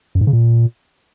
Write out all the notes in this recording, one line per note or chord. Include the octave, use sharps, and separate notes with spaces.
F#2
G#2
C#3
A#2